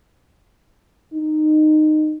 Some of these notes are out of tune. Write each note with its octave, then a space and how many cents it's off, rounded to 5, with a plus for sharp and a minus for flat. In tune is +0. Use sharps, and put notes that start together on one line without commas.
D#4 -15